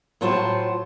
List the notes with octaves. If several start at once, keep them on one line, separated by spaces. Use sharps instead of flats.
A2 F#3 F4 F#4 C5 A5